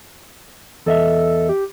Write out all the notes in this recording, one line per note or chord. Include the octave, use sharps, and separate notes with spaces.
E2 A4 D#5 E5
G4